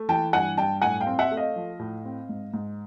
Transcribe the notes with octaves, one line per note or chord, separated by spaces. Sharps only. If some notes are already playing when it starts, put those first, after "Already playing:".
Already playing: A3
E3 G5 A5
G2 F#5 G#5
G2 G5 A5
A2 F#5 G#5
F5 G5
C4
E5 F#5
A3
D#5 F5
F3
A2
C4
G#2
G#2